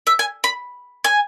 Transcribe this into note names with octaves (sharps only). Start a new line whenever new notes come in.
E5
G#5
B5
G#5